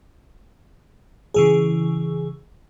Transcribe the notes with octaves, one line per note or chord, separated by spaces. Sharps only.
C#3 E3 G#4